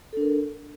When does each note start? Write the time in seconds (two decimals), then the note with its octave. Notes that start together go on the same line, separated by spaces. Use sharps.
0.13 A4
0.17 D4
0.21 A#4